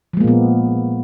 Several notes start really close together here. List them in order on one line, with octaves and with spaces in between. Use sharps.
F3 G#3 A#3 A#2 B3